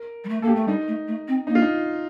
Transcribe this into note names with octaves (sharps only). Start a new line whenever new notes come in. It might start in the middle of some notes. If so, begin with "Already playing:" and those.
Already playing: A#4
G3
A3
A#3 A4
G4
A3
G3 D#4
A3
A3
C4
A#3 D#4
F4
D#4